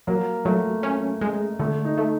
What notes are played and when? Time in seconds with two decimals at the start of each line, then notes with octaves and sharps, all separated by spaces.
0.07 F#3 A#3
0.45 F#3 A3
0.83 C#4
1.21 G#3
1.59 D3 A3
1.84 D#4
1.98 A3